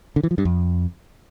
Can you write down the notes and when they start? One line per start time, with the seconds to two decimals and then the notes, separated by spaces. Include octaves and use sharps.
0.16 D3
0.23 E3
0.31 F3
0.38 G2
0.45 F2